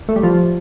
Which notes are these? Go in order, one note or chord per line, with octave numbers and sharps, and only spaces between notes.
A3
G3
F3